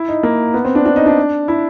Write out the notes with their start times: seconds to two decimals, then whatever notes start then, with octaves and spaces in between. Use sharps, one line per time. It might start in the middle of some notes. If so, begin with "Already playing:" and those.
Already playing: E4
0.08 D#4
0.23 A#3
0.54 B3
0.65 C4
0.75 D4
0.86 D4
0.96 D#4
1.06 D4
1.48 E4